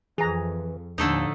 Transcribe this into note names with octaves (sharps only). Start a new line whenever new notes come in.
F2 E3 G#4 A#5
D#2 A2 D3 F3 A3 D#4